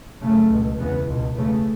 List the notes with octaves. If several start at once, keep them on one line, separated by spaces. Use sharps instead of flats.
F#2 C#3 A3
C#2 B2
E2 C#3 B3
C#2 B2
E2 C#3 A3